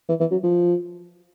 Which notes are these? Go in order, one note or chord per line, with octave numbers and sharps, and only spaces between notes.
E3
E3
F#3
F3